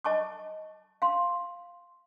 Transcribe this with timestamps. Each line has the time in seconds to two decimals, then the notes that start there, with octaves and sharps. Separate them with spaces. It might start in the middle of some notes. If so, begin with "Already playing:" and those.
0.05 D#5 A5 C#6 D6
1.02 F5 C6